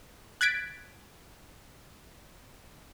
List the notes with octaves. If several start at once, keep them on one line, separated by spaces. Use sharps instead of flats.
F#6 G#6 A6 B6 D7